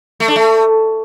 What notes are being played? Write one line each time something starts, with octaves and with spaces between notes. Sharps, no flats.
A3
D4
A3